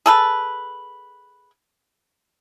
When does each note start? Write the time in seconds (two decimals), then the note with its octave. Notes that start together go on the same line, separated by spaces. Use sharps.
0.06 G#4 A4 B4